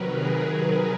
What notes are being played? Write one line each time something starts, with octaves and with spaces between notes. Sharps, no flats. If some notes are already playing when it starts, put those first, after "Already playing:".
Already playing: C3 D#3 F#3 A#4 B4
G#4